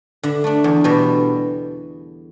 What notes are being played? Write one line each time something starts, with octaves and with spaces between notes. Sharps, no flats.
D3 E5
A3 D4
E2
B2 G3 D4